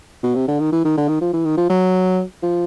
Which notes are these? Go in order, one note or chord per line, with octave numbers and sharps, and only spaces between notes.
B2
C3
D3
D#3
E3
D#3
D3
D#3
F3
E3
D#3
F3
F#3
F3